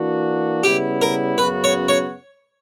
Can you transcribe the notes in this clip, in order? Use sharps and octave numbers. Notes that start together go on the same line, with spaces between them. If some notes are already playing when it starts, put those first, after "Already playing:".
Already playing: E3 A#3 D4 F#4
C#3 G3 B3 E4 G4
A#4
F#2 C#3 F#3 B3 F#4 B4
C#5
C#5